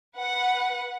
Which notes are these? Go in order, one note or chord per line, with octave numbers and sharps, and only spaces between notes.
B4 F#5